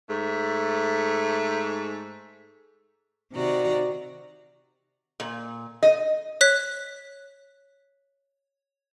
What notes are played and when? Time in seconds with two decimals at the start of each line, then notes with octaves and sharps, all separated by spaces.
0.09 G#2 A3
3.33 C3 D#3 F#4 D5 A#5
5.20 A#2
5.83 D#5
6.41 C#5 F#6 B6